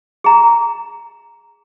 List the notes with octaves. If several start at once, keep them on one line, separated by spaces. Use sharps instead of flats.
G#4 A#5